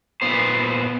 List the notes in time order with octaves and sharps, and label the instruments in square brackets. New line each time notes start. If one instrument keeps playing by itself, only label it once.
[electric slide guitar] A#2 B3 C5